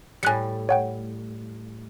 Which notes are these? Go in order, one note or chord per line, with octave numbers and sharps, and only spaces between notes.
A2 G3 G#5 F#6 C#7
C#5 F#5 G5